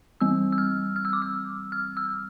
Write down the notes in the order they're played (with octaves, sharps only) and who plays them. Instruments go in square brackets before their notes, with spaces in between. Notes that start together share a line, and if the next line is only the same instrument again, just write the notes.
[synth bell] E3 G3 C4 E6
E6
F6
F6
E6
D6
E6
F6
E6